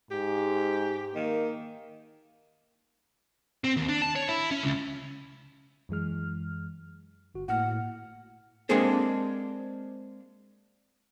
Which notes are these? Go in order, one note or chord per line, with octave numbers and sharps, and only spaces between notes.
G#2 G4
D#3 A#3
C4
D#2
D4
A5
C#5
E4
C#4
C#2
F#2 E3 G#3 F6
G1 F#4
A2 A#3 F#5 F6
G#3 A#3 C4 D4 G#4 A4